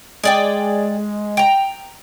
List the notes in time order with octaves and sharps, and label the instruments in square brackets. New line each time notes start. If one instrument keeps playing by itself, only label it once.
[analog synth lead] G#3 [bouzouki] G#4 D5 G5
[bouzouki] G5 A#5